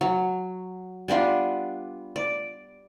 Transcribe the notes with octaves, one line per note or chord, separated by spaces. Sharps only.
F#3
G3 B3 D4 F4
D5